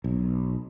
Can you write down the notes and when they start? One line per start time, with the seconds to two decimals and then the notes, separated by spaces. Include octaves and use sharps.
0.04 B1